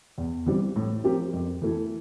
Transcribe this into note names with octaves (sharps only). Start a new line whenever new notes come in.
E2
E3 G3 C4 G4
A2
F3 C4 G4 A#4
F2
E3 A3 E4